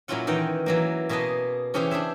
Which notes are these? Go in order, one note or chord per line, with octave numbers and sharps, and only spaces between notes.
A#2 F#3 C#4 E4 F4 F#5
D#3 E3 F#5 G5 A#5
E3 F#3 A#3
B2 A#3 G#4 B4 D#5 A5
C#3 E3 C#4 G4 G#4 C5
D4 G#4 C5 E5